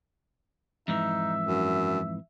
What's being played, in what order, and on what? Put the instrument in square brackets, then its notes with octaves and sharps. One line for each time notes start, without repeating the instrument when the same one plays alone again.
[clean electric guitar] F2 G#2 E3 [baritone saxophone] D#4 [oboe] E5
[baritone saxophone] F#2